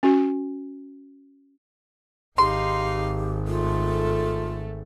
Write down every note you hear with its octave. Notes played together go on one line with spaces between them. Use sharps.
C#4 F#4
G#1 D#4 G4 F5 C6
A3 F4 A4